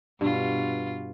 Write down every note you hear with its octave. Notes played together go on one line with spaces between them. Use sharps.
G2 B2 F4